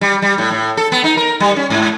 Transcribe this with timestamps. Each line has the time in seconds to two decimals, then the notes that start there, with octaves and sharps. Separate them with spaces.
0.01 G3
0.22 G3
0.38 A2
0.51 A2
0.77 A4
0.92 B3
1.04 D#4
1.17 A#4
1.40 G3
1.56 C#4
1.70 G#2